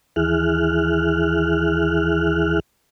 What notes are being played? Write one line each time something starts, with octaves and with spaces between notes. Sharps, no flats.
D#2 E3 E4 G#4 F6 F#6